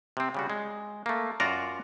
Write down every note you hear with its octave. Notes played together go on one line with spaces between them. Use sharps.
C3 C4
C#3 G3 F#4
G#3
A3 A#3
F#2 F4 F#4 A#4 D5 A#5